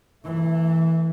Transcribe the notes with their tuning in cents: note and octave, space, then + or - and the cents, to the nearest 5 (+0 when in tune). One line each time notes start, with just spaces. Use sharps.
E3 -10 A3 +35